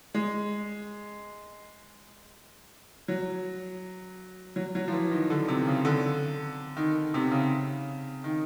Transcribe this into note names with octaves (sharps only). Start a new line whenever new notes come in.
G#3
F#3
F#3
F#3
F3
E3
D#3
D3
C3
C#3
D3
D#3
C3
C#3
D#3